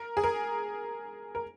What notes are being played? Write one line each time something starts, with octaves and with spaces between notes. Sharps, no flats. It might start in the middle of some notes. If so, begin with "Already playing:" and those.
Already playing: A#4
G#4
A#4
A#4